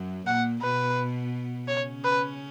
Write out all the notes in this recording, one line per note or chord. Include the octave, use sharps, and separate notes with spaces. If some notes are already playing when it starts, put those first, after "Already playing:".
Already playing: F#2 F#3
A#2 A#3 F#5
B2 B3 B4
C#3 C#4 C#5
B4